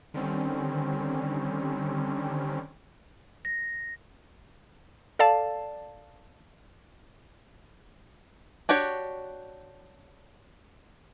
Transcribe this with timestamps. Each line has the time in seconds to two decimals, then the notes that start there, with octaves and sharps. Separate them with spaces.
0.14 D3 D#3 G3 C4 C#4
3.45 A#6
5.19 A4 D5 F5 A5
8.69 D4 F#4 G4 C#5